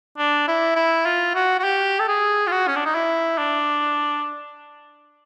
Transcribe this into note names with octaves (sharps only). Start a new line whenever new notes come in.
D4
E4
E4
F4
F#4
F#4
G4
A4
G#4
F4
F#4
C#4
D4
D#4
E4
D4